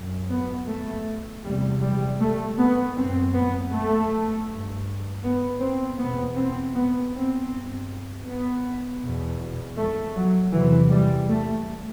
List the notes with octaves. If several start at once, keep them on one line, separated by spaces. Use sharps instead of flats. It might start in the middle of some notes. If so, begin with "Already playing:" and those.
Already playing: F#2
B3
A3
E2 C3 G3
G3
A3
B3
F#2 C4
B3
A3
G2
B3
C4
E2 B2 B3
C4
B3
C4
G2
B3
E2 B2
A3
F#3
E2 C3 E3
G3
A3